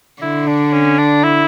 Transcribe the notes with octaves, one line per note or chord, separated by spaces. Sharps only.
D3 E4
D4
C#4
D4
E4